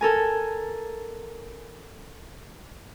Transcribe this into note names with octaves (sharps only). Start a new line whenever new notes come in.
A4 A#4 G#5